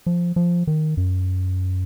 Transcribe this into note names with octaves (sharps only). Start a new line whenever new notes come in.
F3
F3
D#3
F#2